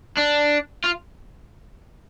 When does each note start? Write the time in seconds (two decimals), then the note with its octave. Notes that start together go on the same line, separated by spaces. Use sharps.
0.17 D4
0.84 F4